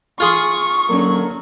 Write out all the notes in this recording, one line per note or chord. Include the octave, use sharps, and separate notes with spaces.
F4 G#4 C6 C#6 F6
D#2 D3 F#3 A#3 C#4